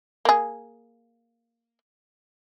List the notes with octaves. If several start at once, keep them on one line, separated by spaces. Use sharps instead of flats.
A#3 G#4